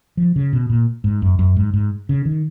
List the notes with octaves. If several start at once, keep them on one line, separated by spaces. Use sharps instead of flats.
F3
C#3
B2
A#2
G#2
F#2
F#2
G#2
G#2
C#3
D#3